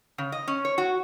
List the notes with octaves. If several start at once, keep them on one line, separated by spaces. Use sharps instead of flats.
C#3
D#5
C#4
C#5
F#4